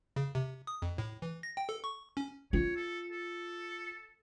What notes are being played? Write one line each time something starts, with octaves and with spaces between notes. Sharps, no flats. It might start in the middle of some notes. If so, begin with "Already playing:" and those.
C#3
C3
D#6
F2
A2
E3
A#6
G5
A4
C#6
C#4
F4 C#5
A4
A4